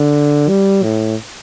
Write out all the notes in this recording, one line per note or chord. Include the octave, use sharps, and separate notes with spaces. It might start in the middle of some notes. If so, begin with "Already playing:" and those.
Already playing: D3
G3
A2